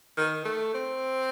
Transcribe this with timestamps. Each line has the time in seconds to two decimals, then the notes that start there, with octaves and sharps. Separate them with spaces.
0.18 D#3
0.45 A3
0.74 C4